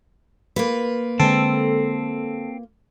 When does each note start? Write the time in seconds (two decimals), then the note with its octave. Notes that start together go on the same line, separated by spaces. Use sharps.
0.56 A#3 F4 B4
1.20 D3 G#3 C4 A4